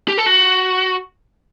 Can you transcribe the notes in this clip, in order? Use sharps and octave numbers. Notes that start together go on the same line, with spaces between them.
G4
A4
F#4